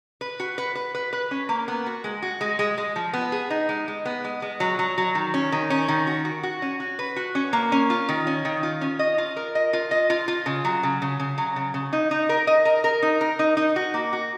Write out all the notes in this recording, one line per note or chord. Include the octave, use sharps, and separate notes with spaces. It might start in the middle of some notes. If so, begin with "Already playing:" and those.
B4
F#4
B4
B4
B4
B4
C#4
A#3
B3
F#4
G#3
F#4
G#3
G#3
G#3
F3
B3
G#4
D#4
G#3
G#3
B3
G#3
G#3
F#3
F#3
F#3
D#3
C#4
D#3
C#4
D#3
F#4
F#4
F#4
C#4
F#4
B4
F#4
C#4
A#3
C#4
F4
D#3
C#4
D#3
F4
C#4
D#5
F4
A#4
D#5
F4
D#5
F4
F4
C#3
F#3
C#3
C#3
C#3
F#3
C#3
C#3
D#4
D#4
A#4
D#5
A#4
A#4
D#4
A#4
D#4
D#4
F#4
A#3
F#4